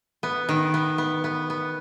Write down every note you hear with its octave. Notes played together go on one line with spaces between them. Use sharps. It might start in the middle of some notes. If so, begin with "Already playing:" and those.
B3
D#3
B3
B3
B3
B3